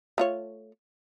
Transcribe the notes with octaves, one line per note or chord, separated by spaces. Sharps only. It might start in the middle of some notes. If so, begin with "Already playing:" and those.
A3 F4 C#5